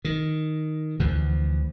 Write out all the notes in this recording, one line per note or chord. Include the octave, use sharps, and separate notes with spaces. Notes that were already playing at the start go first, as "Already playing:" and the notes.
D#3
D2 E3 F3